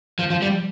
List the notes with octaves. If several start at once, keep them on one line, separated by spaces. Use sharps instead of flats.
F3
F3
G3